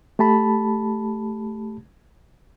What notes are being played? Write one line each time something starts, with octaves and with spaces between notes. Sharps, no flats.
A3 G4 A5 B5